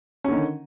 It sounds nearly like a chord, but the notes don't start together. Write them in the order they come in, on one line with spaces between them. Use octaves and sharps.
C#4 D3 D#3